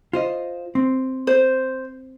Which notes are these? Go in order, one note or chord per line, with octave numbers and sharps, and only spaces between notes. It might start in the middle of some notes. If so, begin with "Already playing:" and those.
F4 C5 D#5
C4
C5